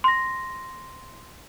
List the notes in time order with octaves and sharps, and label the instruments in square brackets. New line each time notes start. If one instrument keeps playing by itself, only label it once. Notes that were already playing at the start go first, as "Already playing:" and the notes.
[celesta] C6 A#6